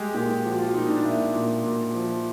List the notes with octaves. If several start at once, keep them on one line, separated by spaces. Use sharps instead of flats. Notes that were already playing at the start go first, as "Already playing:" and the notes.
Already playing: G#3 G4
A#2 G4
F3 F#4
F4
A#2 D#4
D4
A#2 E4
A#2
A#2
F3